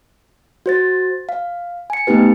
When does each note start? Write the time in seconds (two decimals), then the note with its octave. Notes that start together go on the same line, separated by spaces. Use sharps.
0.66 F#4 C5 A6
1.29 F5
1.90 G#5 C#7
2.07 A3 B3 D#4 G4 B4